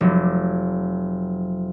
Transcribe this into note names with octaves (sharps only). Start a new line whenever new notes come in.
F1 F#3